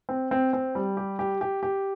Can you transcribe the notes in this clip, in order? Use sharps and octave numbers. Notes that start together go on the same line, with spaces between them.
C4
C4
C4
G3
G4
G4
G4
G4